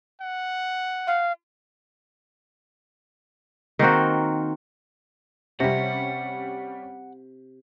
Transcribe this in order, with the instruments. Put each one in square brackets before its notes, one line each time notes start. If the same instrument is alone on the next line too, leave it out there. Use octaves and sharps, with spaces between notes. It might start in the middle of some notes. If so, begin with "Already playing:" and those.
[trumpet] F#5
[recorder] F5
[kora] D#3 A#3 C4 F#4
[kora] C3 [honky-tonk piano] G3 C#4 [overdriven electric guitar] F#5